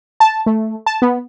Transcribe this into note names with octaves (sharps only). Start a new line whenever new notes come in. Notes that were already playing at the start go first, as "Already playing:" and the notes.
A5
A3
A5
B3